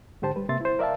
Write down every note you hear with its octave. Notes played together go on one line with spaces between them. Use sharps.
G#2 D3 G4 C5 A5
G3 B4
C3 A#3 E5 C6 A6
E4 C5
A#4 D5 E5 F5 A5